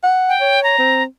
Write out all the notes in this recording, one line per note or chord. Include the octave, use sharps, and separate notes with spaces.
F#5
G5
C#5
A#5
C4